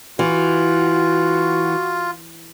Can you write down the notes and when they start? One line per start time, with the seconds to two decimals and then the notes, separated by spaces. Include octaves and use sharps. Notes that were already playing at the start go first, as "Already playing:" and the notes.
0.19 E3 F4 F#4